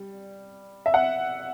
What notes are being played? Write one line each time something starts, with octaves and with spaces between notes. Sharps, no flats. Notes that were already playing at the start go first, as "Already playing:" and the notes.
Already playing: G3
E5
F#5